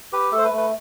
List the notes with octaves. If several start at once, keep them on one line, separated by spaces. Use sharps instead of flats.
G4 B4
A3 A4
C5
B4
A3
B4